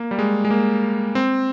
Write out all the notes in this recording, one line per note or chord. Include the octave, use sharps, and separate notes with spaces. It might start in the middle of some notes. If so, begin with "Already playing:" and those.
Already playing: A#3
G3
G#3
G#3
A#3
C4